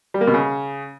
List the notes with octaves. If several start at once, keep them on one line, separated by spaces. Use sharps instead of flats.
G3
A#3
B2
C#3